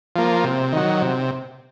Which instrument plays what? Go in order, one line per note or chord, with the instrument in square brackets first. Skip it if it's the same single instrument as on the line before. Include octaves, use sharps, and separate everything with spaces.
[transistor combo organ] F3 A#3
C3
D#3 F#3
C3